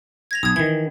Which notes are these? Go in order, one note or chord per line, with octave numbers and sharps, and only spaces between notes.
G#6 A#6 F7
B1 D#6 G#6
D#3 E3 G#6